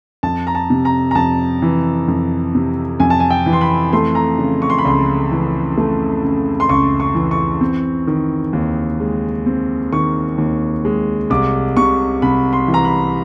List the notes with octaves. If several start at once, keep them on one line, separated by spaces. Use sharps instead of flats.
F2 A5
A#5
A5
C3
A#5
A#5
F2 A5
E3
F2
C3
F2 G#5
A5
G#5
G5
E3
C6
B5
A3 C6
A#5
C#3
C#6
C6
B5
C#2 C6
E3
A3
C#3
C6
C#2 C#6
C#6
E3
C#6
C4
D#3
D#2
G#3
C4
D#3 C#6
D#2
G#3
C2 D6
C3 C#6
C2 B5
C6
E3
A#5
B5